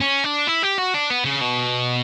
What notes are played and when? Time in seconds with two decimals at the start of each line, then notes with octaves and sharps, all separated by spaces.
0.01 C#4
0.24 D4
0.48 E4
0.63 G4
0.78 F#4
0.94 D4
1.10 B3
1.25 C#3
1.41 B2